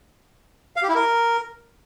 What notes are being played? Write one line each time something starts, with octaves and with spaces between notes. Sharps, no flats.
F5
G4
E4
A#4